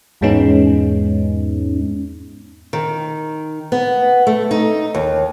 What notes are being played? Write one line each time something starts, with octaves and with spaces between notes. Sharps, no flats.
E2 G#2 G#3 B3 C#4 D#4
D#3
B3
A3
D#4
D#2